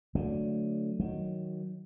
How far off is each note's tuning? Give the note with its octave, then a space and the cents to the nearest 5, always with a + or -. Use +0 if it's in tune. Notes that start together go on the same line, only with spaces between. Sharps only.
D3 +0 F#3 -10 A3 +0
D#3 +10 F#3 +0